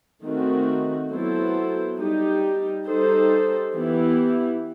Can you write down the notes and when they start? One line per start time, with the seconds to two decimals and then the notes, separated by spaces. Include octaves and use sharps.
0.22 D#3 A3 C4 F#4
1.10 F#3 B3 E4 A4 C5
1.98 G3 D#4 G4
2.86 G3 D#4 A4 C5
3.74 E3 B3 E4 G4